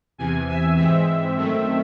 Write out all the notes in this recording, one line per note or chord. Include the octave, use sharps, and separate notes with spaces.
E2 C3 E3 G#5
E5
G#2 E3 G#3 C4 E5
F#2 D#3 A3 C4